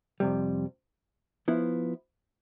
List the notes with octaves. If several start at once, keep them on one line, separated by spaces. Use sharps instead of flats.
F2 C3 G3
F3 B3 E4